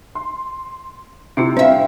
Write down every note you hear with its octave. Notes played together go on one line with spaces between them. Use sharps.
C6
C3 E4 F4 G4
G2 C4 D4 C5 E5 F5